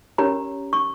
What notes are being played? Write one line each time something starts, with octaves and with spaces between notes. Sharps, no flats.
C#4 G4 A#4 C#5 A#5
C#6